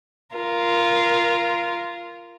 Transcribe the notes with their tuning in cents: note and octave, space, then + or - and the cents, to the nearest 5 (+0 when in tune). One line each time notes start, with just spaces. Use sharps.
F4 -15 A#4 +5